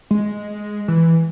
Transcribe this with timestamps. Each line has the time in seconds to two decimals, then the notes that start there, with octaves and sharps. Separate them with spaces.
0.11 G#3
0.88 E3